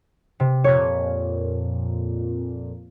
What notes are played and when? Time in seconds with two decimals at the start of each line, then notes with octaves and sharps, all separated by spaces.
0.40 C3
0.64 F2 A#2 C#5 G#6